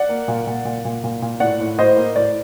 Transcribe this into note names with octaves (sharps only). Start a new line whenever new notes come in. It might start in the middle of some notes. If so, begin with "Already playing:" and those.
Already playing: D5 F#5
A#3
A#2
A#2
A#2
A#2
A#2
A#2
A2 D5 F#5
A2
A2 C5 D#5
A#3
A2 D5